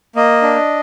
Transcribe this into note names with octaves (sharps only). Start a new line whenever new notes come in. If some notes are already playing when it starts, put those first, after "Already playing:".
A#3 D#5
D4